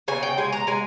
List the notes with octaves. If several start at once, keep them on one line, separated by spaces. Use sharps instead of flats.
C#3 G#5
G5
G#3 G#5
A#5
G#3 G#5